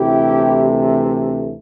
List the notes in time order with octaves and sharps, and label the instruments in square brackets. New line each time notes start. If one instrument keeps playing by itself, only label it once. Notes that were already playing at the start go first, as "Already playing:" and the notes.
Already playing: [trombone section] D2 C3 E3 A3 E4 G4